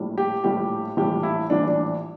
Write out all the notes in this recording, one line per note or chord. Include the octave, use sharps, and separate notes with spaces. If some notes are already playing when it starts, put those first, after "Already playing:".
Already playing: A#1 A2 G3
G4
A#1 A2 G3 G4
A#1 A2 E3 G3 G4
E4
A#1 A2 E3 G3 D4
D4